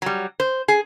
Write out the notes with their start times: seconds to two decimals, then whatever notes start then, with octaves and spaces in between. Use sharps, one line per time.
0.02 F#3 G3
0.40 C5
0.68 G#4